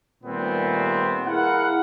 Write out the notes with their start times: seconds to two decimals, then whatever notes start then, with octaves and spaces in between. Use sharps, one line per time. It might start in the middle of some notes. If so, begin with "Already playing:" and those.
0.23 A#2 D#3 G3 A3 B3 C4
1.26 E4 G#4 A#4 F5 F#5